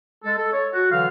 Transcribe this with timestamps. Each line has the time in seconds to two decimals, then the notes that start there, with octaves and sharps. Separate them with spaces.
0.25 G#3 A4
0.39 A4
0.53 C#5
0.74 F#4
0.91 D3 E3 F#3 F5